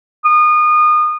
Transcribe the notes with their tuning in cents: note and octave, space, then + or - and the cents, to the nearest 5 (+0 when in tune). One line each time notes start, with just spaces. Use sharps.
D#6 -30